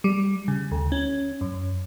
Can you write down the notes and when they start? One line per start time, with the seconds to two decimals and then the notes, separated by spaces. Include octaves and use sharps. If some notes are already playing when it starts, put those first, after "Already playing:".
0.04 G3
0.48 C#3
0.72 D2
0.92 C#4
1.41 F#2